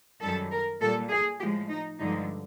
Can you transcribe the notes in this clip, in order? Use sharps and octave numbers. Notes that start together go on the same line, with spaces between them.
F#2 D#3 G3 A4
A#4
A#2 G3 A4
G#4
A2 F3 G#3 G4
D#4
G2 D3 F3 G#3 D#4